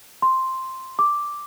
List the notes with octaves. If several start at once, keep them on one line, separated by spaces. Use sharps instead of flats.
C6
D6